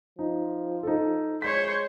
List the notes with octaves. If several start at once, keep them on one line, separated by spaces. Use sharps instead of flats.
F3 D#4
D#4 A4
G#3 C5 C#5 B6